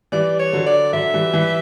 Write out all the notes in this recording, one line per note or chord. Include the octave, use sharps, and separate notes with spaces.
E3 G3 D5
C#5
D3 F#3
D5
D3 F#3 E5
E3 G3
E3 G3